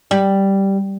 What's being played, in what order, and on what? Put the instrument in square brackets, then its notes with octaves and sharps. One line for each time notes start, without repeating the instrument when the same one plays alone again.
[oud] G3